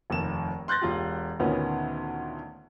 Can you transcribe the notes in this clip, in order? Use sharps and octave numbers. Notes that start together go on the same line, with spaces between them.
F1 D#2 E7
C6 F#6 G6 A6 A#6
E1 F4 G4
D2 A#2 D#3 B3 C#4